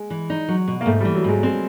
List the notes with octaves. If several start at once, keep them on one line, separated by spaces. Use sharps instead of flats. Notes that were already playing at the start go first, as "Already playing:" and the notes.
Already playing: G#3
E3
D#4
F#3
B2
A#3
G#2 A3
E3 G3
F#3
G#2 G#3
G#3 C4